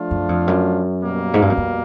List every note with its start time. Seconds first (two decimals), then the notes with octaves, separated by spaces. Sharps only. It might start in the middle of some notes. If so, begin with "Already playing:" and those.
Already playing: F3 A3 D4 F4
0.11 F#2
0.29 F2
0.47 F#2
1.02 B2 G3 A#3
1.34 G#2
1.42 G2
1.50 F#2
1.57 F2